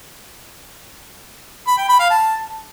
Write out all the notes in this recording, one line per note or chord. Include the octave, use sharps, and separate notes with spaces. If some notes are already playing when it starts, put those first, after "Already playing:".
B5
G5
B5
F5
A5